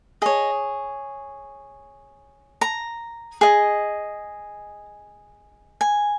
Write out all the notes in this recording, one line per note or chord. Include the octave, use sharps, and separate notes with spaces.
G#4 C#5 D#5
A#5
G#4 D#5
G#5